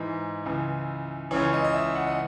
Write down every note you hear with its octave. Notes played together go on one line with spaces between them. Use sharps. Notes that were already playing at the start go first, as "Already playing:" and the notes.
Already playing: G#2 E3
C#2 C#3 E3
C#2 C#3 E3 C#5
D#5
D#5
E5
F#5
D#5